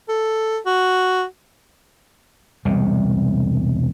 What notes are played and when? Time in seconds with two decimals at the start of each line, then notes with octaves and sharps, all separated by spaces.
0.09 A4
0.66 F#4
2.65 E1 C2 C3 G3